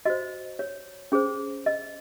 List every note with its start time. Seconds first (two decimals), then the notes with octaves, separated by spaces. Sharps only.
0.05 F#4 C5 D#5
0.59 C#5
1.12 C#4 G#4 C5
1.66 D#5